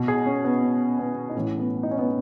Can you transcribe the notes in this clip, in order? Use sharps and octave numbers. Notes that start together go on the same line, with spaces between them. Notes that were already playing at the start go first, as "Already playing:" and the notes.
Already playing: B2
G#4
C#4
B3
C#4
B3
D#4
A2 E3 C#4
B3
D#4
C#4
B3